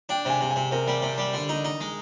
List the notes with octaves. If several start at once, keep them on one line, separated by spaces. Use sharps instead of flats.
D4 G5
C3 G#5
C3
G#5
C3
C3 A#4
G3
C3
G3
D3
D#4
D#4
G#3